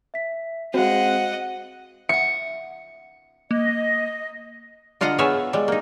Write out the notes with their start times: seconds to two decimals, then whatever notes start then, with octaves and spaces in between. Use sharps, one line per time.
0.14 E5 B6
0.74 G#3 C4 F#4 C5 D#5 F5 F#5
2.09 E5 F#5 C#7
3.51 A#3 D#5
5.01 D3 F4 D#5 F5 F#5 A#5
5.19 B3 F4 G#4 C#5 E5 G#5
5.53 G3 G#3
5.68 A#3 D#4